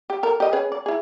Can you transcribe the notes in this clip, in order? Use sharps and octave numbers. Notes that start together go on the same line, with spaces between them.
G4
A4 A#4
G4 D#5
C#4 G#4 B4
D5
E4 G#4